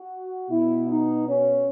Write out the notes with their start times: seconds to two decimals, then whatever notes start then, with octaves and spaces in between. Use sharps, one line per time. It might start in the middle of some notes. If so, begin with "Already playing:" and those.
Already playing: F#4
0.50 B2 E4
0.89 D#4
1.28 C#4